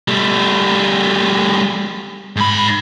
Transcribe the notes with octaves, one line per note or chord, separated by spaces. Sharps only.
G3 A3
G#2 B5